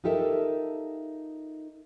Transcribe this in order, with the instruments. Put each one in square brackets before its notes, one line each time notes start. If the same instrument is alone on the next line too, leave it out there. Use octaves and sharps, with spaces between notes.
[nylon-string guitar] D#4 F4 G4 A4 A#4 E5